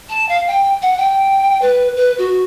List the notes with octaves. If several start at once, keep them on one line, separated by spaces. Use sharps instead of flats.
A5
F5
G5
F#5
G5
B4
B4
F#4